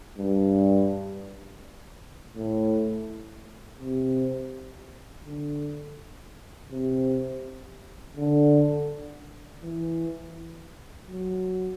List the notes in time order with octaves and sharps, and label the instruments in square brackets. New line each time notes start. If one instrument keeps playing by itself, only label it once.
[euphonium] G2
A2
C3
D3
C3
D3
E3
F#3